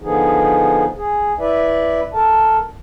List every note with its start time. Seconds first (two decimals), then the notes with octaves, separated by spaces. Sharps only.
0.02 D3 F3 B3 D#4 G#4
0.96 G#4
1.39 E4 B4 D5 E5
2.14 A4 A#4 A5